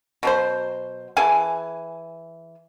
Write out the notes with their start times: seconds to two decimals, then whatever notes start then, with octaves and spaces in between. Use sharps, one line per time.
0.23 B2 F#3 C5
1.17 E3 G#4 G#5 A5